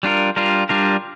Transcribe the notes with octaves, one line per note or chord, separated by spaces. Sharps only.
G3 D4 F4 A#4
G3 D4 F4 A#4
G3 D4 F4 A#4